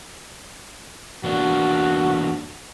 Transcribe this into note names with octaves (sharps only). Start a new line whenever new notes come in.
E2 A#3 D4 F#4